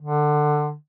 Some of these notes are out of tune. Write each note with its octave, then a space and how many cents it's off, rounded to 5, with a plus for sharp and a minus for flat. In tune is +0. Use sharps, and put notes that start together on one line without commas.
D3 +20